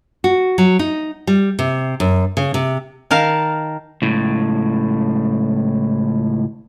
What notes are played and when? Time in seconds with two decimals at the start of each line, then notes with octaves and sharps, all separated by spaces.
0.24 F#4
0.58 F#3
0.79 D#4
1.27 G3
1.59 C3
2.00 F#2
2.37 C#3
2.54 C3
3.11 D#3 A#4 F5 A5
4.02 C#2 A2